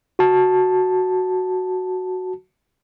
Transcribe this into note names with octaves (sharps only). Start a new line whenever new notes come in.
F#4 A5